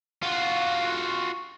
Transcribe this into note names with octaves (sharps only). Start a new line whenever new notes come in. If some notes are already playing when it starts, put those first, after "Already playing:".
F4 F#4